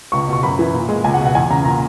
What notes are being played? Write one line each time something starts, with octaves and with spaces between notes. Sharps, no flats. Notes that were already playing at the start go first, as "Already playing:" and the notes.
C#2 C#6
B2 C#6
F#2 B5
E3
A#2
G#3
C#2 G#5
F#5
B2
F#5
E2 G#5
C#3 A#5
A#2 A#5